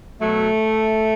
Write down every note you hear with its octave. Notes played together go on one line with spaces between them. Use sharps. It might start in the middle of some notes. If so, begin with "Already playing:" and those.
B2 F#3 A3